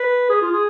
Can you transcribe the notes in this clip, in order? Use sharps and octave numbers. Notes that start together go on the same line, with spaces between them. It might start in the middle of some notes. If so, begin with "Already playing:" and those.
Already playing: B4
G#4
F4
G#4